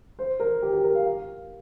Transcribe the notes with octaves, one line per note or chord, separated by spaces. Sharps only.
C5
A#4
G4
G4
A#4
F5
F5